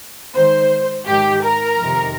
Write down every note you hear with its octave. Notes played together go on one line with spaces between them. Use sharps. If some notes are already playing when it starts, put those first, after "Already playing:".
G#2 D#3 C5
G#2 D#3 G4 G5
A#4 A#5
F2 C3 D#3